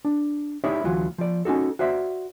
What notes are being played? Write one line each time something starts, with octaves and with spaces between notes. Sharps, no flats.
D4
D#4 E4 G4 C#5 D5
D2 E3 F#3 F4
F3 D5
C#4 D#4 F#4 A4
F#4 C5 D5 E5